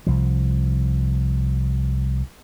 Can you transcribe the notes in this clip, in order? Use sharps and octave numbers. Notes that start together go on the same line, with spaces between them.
C2 F3